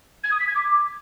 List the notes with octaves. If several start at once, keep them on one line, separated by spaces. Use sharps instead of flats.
G#6
D#6
B6
G#6
D6